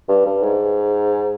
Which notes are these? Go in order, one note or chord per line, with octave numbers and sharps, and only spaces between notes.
G2
G2
G#2